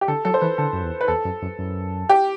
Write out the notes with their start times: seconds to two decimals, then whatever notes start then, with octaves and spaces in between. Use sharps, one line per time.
0.01 G4
0.08 D3 A4
0.25 F#3 A4
0.34 C5
0.41 E3 B4
0.58 D3 A4
0.73 F#2
0.83 E2
1.01 B4
1.08 E2 A4
1.25 F#2
1.42 F#2
1.59 F#2
2.09 G4